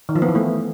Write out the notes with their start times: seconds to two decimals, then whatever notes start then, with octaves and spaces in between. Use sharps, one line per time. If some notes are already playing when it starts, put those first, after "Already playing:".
0.09 D#3
0.15 F3
0.22 B3
0.29 E3
0.35 A3